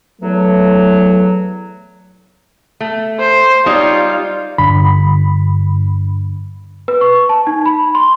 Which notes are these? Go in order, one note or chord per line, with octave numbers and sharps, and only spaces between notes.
E2 F#3 A3
A3
C5
G3 D#4 F4 C#5
G2 D3 B5
B4
C#6
A5
D#4
B5
C6